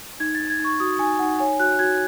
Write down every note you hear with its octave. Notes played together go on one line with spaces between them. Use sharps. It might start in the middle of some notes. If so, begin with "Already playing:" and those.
D#4 G#6
A6
D#4
G#6
D#4
C#6
F#4 D#6
D#4 G#5
D#4 F#5
C#5 G#5
F#4 F#6
F#4 G#6